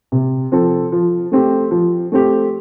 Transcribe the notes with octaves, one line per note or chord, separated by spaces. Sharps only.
C3
F3 C4 A4
F3
A3 C4 G4
F3
A3 C4 G4